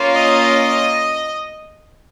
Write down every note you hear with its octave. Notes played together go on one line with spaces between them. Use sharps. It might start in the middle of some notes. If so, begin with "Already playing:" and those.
Already playing: A#3 C#4 F4
D#5